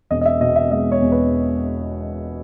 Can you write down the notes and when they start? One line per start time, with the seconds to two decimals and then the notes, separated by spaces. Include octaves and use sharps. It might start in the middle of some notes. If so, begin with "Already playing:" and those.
0.10 E1 D#5
0.21 D#5
0.26 E5
0.41 B2 D#5
0.56 E5
0.71 G#3 D#5
0.92 C#5
1.02 E2
1.12 B4